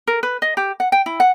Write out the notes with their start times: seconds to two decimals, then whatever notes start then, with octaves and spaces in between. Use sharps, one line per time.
0.07 A#4
0.23 B4
0.42 D#5
0.57 G4
0.80 F#5
0.92 G5
1.06 E4
1.20 F#5